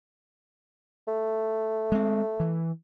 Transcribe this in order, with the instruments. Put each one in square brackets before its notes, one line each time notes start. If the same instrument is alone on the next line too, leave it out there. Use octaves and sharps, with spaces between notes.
[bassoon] A3
[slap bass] G#3 C4
E3